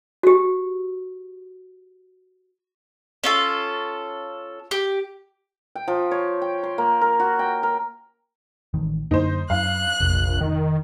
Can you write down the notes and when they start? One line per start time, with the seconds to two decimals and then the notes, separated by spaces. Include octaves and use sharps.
0.23 F#4 G4
3.24 C#4 F4 A4
4.71 G4
5.75 G5
5.88 F3
6.11 C#5
6.42 G5
6.63 C6
6.78 A#3
7.01 A#4
7.20 F#4
7.39 G5
7.63 A#4
8.74 A1 D#3
9.11 F#2 D3 A#3 D#4 C5
9.50 F#2 F5 F#6
10.01 F1 A#1
10.41 D#3